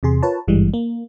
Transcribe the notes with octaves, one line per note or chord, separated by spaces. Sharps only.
E2 C3 G#4 C6
F4 A#4 B4 C#5 A5
G#1 G2 E3 G3 G#3
A#3